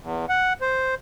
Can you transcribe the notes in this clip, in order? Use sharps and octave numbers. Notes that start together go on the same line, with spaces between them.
E2
F#5
C5